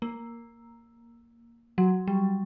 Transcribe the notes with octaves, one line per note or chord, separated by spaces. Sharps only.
A#3
F#3
G3